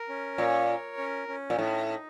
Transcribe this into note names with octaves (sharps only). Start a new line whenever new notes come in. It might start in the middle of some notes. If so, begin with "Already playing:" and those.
Already playing: A#4
C#4
A#2 C#5
A#4
C#4
C#4
A#2
A2 D#4
D#4